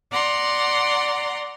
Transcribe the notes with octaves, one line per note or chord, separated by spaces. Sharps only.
D5 F#5 A#5 C6